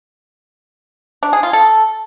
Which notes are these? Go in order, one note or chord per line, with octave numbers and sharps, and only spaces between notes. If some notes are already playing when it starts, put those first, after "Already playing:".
D4
G#4
F4
A4